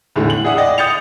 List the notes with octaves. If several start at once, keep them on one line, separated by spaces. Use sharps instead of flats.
E2 A2 D3 G#3
F#7
G#4 D5 E5 F#5 D#6
D5 D#5 G5
D#6 G6 A6 C#7 F7